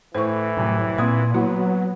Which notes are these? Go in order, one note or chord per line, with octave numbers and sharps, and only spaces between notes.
A2 E3 C5 C#6
C2 F#2 A2 C3
A#2 A#3 C4 C6 D#6 G#6
F#3 A#3 B3 E4 F#4